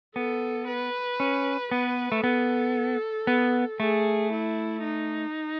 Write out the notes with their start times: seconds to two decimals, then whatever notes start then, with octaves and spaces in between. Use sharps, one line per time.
0.16 B3 A4
0.67 B4
1.20 C#4
1.71 B3 B4
2.12 A3
2.24 B3 A4
3.27 B3
3.80 A3 G#4
4.32 E4
4.84 D#4